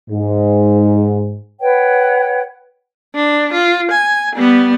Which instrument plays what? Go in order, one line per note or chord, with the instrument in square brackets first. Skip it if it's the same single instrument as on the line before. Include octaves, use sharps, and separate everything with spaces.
[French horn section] G#2
[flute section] B4 C#5 F#5 G5
[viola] D4
F4
G#5
G3 B3